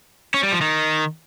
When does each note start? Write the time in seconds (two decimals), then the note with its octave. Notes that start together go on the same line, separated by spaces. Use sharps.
0.34 C#4
0.43 G3
0.52 F3
0.61 D#3